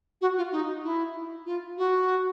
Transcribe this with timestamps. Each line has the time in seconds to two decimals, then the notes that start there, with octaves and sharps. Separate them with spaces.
0.21 F#4
0.38 F4
0.52 D#4
0.84 E4
1.46 F4
1.78 F#4